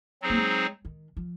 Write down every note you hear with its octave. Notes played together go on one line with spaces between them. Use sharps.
F#3 C4 D#4 G#4 C5
A#3
G#3
D#3
F3